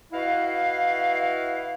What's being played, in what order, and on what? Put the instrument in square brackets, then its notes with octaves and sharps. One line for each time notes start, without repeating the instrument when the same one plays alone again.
[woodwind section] E4 F#4 B4 D#5 F5